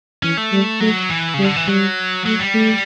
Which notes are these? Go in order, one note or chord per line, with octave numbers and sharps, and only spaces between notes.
E3 C#4
A3
G3
F#3 A3
E3
C#3 G3
D3
E3
F#3 G3
F#3 A3
G3
A3